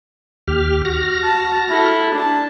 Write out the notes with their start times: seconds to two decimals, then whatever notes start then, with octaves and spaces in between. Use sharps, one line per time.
0.48 D#2 G4 F6
0.85 F#4 F6 A#6
1.24 A5
1.70 E4 A4
2.14 D4 A5